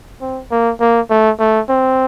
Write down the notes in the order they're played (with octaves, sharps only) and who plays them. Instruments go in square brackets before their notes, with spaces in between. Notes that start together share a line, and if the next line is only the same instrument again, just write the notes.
[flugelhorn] C4
A#3
A#3
A3
A3
C4